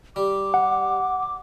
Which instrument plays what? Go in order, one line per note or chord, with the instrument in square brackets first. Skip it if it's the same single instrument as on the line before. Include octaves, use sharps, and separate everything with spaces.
[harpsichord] G3 [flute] D6
[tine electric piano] F#5